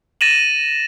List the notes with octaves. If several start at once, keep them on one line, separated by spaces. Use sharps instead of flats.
A6 A#6 D#7 E7 F#7